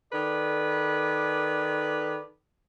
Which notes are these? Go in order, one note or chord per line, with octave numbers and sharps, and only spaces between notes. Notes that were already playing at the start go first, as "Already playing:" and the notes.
D#3 A4 B4 D5